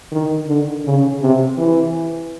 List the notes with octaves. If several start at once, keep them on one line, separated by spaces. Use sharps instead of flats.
D#3
D3
C#3
C3
E3